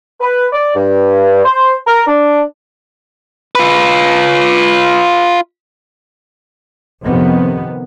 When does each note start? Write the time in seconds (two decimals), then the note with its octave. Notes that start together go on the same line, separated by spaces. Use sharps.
0.21 B4
0.53 D5
0.75 G2
1.44 C5
1.86 A#4
2.07 D4
3.55 F4 B4
7.03 F2 C3 D#3 B3